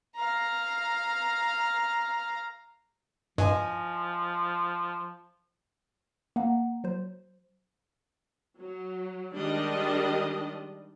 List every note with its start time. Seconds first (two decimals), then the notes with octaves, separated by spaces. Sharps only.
0.16 F5 A#5
3.38 G2 F3 D#5 G#5
6.36 A#3 F#5 A#5
6.84 F#3 C5
8.58 F#3
9.34 D#3 G3 G#3 D4 G4 D#5